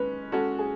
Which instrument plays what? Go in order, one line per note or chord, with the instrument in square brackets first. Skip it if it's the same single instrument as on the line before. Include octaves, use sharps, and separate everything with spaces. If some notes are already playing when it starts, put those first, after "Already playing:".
Already playing: [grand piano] G#3 C#4 [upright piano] B4
[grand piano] G#3 C#4 F#4 [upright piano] A4
[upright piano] G#4